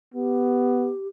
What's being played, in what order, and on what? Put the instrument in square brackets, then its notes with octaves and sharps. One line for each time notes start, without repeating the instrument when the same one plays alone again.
[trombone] B3 [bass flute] G4